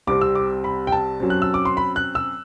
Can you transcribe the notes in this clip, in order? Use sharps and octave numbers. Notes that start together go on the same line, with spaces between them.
C2 C3 G3 C4 D6
E6
D6
B5
G5
A5
F#2 F#3 C4
F#6
E6
D6
C6
B5
F#6
E6